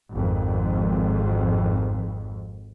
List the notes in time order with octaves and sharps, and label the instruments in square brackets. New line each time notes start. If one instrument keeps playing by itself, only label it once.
[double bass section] G#1 F2